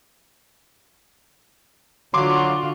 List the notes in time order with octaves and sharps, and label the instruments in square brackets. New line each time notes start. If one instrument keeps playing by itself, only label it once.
[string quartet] D3 F4 F#4 [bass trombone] F#3 [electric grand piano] C6 D6